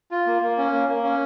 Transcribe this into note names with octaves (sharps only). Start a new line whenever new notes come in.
F4
A#3
A#3
C#4
A#3
A#3
C#4